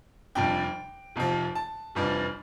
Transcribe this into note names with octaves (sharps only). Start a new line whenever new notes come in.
F1 F2 C3 G3 D4 G5
F1 F2 C3 F3
A5
F1 F2 E3 G3 D4